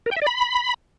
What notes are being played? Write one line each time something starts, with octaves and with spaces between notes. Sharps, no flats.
A#4
G5
E5
D5
B5